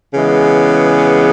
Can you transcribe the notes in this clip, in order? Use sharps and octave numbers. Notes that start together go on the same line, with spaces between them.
C#3 E3 G#3 B3